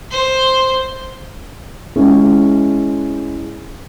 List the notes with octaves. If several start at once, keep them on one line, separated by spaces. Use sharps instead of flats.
C5
G#3 C#4 E4